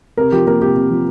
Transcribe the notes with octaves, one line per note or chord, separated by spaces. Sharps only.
C3 A#4
F3 G4
A#3 A#4
C3 G4
C3
F3